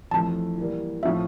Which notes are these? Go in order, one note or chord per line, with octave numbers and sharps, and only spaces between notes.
F2 E3 A3 A5
E3 G3 A#3
A2 F3 C4 F4 E5